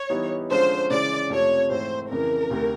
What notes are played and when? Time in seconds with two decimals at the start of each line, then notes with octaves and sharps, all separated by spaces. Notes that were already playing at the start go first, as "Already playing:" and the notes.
Already playing: C#5
0.10 E3 G3 B3 D#4
0.50 D3 F3 G#3 C#4 F4 C5
0.90 C#3 E3 G#3 C#4 D5
1.30 F2 C3 F3 A3 C#5
1.70 G#2 E3 A3 C4 C5
2.11 F2 C#3 E3 A#4
2.50 D2 C3 D#3